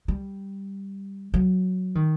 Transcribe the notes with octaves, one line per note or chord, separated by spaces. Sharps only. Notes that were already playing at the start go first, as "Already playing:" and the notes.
G3
F#3
D#3